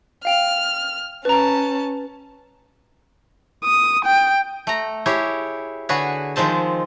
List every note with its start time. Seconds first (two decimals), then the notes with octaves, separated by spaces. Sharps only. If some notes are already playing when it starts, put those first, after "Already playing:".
0.25 F5 G5 F6 F7
1.25 C#4 B4 A5 A#5
3.65 D#6
4.05 G5
4.67 A3 A#5
5.06 E4 G4 G#4 C#5
5.89 D3 F#4 G#4 B4 C#5
6.36 D#3 F3 G#3 C4 A5